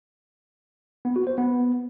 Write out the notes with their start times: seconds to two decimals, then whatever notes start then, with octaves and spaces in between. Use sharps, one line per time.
1.05 B3
1.16 F#4
1.27 C5
1.38 B3